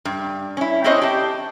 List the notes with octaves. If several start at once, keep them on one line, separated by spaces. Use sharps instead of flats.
G2
C#4 E4
C4 D4 E4 C5 C#5 D#5
G4 A5